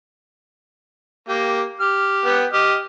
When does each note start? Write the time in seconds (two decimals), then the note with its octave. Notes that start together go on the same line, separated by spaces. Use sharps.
1.29 A#3 G4
1.80 G4 F6
2.26 B3 F#5 G5
2.53 G4 D#5 F6